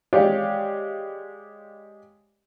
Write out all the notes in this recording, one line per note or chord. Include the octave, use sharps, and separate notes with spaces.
G#3 G4 C#5 D5 F5